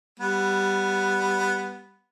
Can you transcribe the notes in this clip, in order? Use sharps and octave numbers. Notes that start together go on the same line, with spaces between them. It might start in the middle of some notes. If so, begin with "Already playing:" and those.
G3 B3